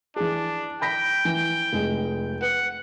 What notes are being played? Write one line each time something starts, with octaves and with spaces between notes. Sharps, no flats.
E3 D4 G#4
G5 B5 A#6 B6
E3
F1 G#3
B4 F#5